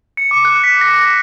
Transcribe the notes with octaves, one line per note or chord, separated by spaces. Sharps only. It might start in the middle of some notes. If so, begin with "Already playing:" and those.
C#7
D6
F#6
B6
A#6
A#6